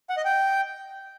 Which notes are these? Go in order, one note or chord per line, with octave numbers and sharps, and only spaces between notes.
F#5
D#5
G5